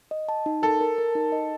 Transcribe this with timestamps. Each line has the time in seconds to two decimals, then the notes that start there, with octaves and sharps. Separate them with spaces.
0.11 D#5
0.29 A5
0.46 D#4
0.62 A4 A#4
0.81 A#4
0.98 A#4
1.15 D#4
1.32 D#5